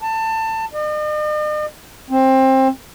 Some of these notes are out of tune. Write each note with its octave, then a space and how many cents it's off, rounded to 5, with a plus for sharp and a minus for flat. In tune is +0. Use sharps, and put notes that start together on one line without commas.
A5 +20
D#5 -45
C4 +20